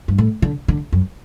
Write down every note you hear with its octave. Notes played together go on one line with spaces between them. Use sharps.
G2
A2
D3
D3
F#2